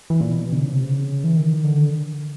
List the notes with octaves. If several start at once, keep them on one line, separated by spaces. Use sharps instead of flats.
E3
A#2
B2
D3
C#3
C3
C#3
E3
D#3
D3